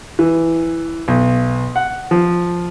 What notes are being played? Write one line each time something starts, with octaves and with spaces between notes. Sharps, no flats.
E3
B1
F#5
F3